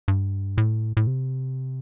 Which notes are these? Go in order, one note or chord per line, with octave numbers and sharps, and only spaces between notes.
G2
A2
A2
C3